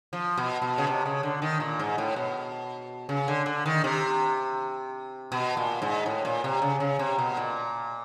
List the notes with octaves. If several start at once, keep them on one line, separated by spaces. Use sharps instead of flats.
F3
B2
B2
C#3
C3
C#3
D3
D#3
A#2
G#2
A2
B2
C#3
D3
D3
D#3
C3
B2
A#2
G#2
A2
A#2
C3
C#3
C#3
C3
B2
A#2